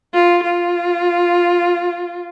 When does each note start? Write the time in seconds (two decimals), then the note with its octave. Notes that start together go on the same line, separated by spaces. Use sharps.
0.14 F4
0.44 F4